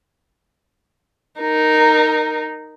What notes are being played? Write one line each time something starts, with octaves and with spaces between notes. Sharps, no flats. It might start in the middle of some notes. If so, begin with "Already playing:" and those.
D#4 A#4